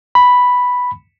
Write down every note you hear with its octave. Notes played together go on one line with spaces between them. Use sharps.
B5